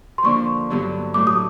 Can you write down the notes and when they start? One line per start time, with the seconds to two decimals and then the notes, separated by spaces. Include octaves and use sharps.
0.18 C6
0.23 D3 F3 A#3 D4 C#6
0.70 G2 D3 F#3 B3
1.14 A2 F#3 A3 D6
1.27 D#6